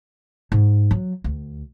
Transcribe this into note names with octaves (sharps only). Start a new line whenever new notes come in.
G#2
F#3
D2